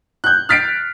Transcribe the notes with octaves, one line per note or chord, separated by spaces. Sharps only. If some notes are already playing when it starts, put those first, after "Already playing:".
F#6 G6
F6 A6 B6 C7 D7